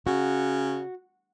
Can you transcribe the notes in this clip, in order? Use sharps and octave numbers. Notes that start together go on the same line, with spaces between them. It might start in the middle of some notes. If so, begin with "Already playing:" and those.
C#3 F#4